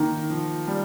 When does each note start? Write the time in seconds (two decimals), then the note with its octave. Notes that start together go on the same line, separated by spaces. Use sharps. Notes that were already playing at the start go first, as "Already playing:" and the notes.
Already playing: D#3 A#3
0.30 F3
0.67 G3